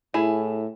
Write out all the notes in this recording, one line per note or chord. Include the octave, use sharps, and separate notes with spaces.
A2 E4 G#4